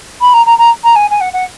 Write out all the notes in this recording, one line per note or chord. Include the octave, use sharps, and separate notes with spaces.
B5
A#5
A#5
A#5
A#5
G#5
G#5
F#5
F#5